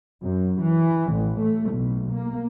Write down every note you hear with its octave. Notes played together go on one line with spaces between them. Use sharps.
F#2
E3
A1
A3
B1
A#3